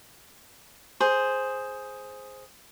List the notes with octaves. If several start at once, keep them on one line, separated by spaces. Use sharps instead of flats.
G#4 C5